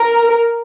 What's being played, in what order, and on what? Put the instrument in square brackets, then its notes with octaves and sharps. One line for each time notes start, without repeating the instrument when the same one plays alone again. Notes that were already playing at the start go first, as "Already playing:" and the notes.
Already playing: [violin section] A#4